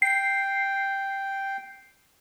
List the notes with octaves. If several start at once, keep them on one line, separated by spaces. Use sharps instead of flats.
G5 C7